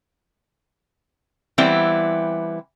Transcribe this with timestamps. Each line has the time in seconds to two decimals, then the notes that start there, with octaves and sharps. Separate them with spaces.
1.58 E3 G3 B3 C4 E4